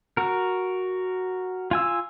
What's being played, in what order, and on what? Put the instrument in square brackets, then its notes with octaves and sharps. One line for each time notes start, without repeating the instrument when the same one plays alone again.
[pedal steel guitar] F#4 A#4
F4 G#5 E6